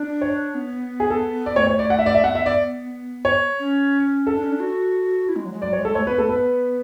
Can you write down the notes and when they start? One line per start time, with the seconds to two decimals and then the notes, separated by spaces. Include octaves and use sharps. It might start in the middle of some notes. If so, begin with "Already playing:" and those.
Already playing: D4
0.21 C#5
0.55 B3
1.00 G#4
1.10 A4
1.46 D5
1.56 A3 C#5
1.67 C#5
1.79 D5
1.90 F#5
1.99 E5
2.06 D5
2.15 E5
2.23 B3 F#5
2.35 E5
2.46 D5
3.25 C#5
3.59 C#4
4.27 A4
4.35 D4
4.43 C#4
4.52 D4
4.60 F#4
5.29 E4
5.36 G#3
5.45 F#3
5.53 G#3
5.62 F#3 D5
5.73 C#5
5.79 G#3
5.85 A4
5.95 A3 C#5
6.06 B3 B4
6.18 A3 A4
6.29 B3 B4